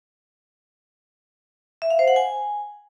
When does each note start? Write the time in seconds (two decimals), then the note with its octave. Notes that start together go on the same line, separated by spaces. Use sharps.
1.82 E5
1.90 F5
1.99 C5
2.08 F#5
2.16 G#5